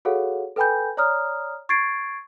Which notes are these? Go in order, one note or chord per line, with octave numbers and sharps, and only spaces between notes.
F#4 G#4 A4 C#5 F5 F#5
A4 B4 G5 G#5 B5 G6
C#5 D5 A#5 D#6 F6
C#6 G#6 A6 C7 D7